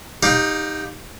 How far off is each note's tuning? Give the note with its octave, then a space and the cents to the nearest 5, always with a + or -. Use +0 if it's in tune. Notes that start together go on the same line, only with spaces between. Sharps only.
D#4 +0 G4 +15 F5 +35